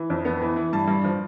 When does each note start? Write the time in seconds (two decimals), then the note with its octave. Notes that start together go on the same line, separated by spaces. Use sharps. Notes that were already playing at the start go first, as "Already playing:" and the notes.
Already playing: E3
0.10 F2
0.25 B3
0.42 E3
0.56 E3
0.73 G2 A5
0.88 G2
1.04 F3